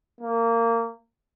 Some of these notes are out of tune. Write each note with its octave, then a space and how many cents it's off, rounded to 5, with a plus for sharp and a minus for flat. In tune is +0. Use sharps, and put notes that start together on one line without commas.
A#3 -20